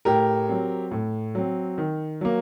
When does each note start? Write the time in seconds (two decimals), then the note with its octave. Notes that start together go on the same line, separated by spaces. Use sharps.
0.05 A2 G4 A#4
0.49 F#3 C4
0.91 A2
1.35 F#3 C4
1.78 D#3
2.21 F#3 A#3